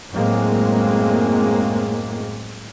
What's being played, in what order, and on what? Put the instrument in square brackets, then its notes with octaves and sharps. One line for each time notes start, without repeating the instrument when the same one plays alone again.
[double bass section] F#2 A2 G#3 A#3 C4